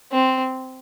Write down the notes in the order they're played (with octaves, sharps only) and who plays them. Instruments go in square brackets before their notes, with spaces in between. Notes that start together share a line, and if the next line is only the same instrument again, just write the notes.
[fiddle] C4